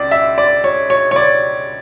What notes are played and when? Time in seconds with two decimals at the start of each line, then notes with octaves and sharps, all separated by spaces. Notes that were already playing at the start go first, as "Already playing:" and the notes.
Already playing: C#2 D5
0.11 E5
0.38 D5
0.64 C#5
0.90 C#5
1.11 C#5
1.16 D5